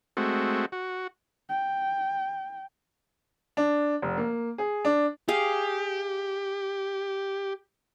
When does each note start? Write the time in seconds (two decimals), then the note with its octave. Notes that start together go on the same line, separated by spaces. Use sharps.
0.17 G#3 A3 C4 F#4
0.72 F#4
1.49 G5
3.57 D4
4.02 F1
4.17 A#3
4.58 G#4
4.85 D4
5.28 G4 G#4 F5